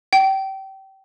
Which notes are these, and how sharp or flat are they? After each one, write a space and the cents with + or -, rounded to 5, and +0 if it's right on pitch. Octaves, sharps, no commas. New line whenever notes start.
G5 -25